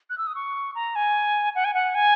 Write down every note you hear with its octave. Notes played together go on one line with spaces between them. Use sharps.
F#6
E6
D#6
C#6
A#5
G#5
F#5
G#5
F#5
G#5